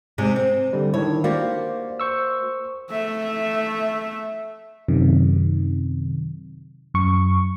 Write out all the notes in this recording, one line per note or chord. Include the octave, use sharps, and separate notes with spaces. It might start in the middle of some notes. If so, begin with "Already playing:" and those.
G#2 C3 G#3
C4
D3 G3
D#3 D4 E4 C#5
A#3 F#4 G4 C5 D5 F5
C5 C#6 E6
A3 E5
F#2 C3 D#3
F#2 C#6